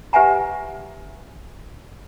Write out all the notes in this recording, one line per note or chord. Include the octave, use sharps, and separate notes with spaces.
G4 B4 E5 F#5 G#5 A#5